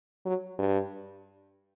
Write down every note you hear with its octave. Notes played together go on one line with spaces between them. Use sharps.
F#3
G2